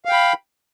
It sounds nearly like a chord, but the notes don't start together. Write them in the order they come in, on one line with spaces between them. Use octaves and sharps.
F5 G5 B5